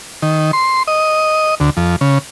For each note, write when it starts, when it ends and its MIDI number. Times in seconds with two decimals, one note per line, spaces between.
0.22 0.51 51
0.53 0.83 84
0.87 1.55 75
1.60 1.70 38
1.77 1.96 41
2.01 2.18 49